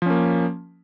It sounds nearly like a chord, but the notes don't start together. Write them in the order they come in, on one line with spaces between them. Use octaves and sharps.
F3 C#4 A#3